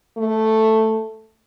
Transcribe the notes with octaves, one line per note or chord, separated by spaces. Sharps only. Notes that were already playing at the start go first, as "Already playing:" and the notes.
A3